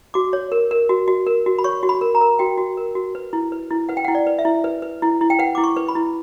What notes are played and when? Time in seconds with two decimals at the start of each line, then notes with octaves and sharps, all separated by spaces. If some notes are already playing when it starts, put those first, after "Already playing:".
0.14 F#4 D6
0.33 C#5
0.52 A#4
0.71 A#4
0.89 F#4
1.08 F#4
1.27 A#4
1.46 F#4
1.59 B5
1.64 C#5 C#6
1.83 F#4
1.89 B5
2.01 A#4
2.15 A#5
2.21 A#4
2.39 F#4 G5
2.58 F#4
2.77 A#4
2.95 F#4
3.15 B4
3.33 E4
3.52 B4
3.71 E4
3.89 B4 F#5
3.97 G5
4.05 E4 F#5
4.15 D5
4.27 B4
4.39 E5
4.45 E4
4.64 B4
4.82 B4
5.02 E4
5.21 E4
5.30 G5
5.39 B4 F#5
5.55 E4 D6
5.64 C#6
5.77 B4
5.88 B5
5.95 E4